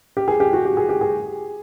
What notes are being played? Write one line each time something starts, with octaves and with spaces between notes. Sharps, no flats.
G4
G#4
G4
F#4
G4
G#4
G4
G#4